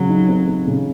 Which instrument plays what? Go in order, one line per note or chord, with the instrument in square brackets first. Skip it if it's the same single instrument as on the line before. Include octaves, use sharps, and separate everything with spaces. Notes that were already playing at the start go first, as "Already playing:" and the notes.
Already playing: [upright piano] C#3 C4 [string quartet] F#3
[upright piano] D#4
C4
C4
C#3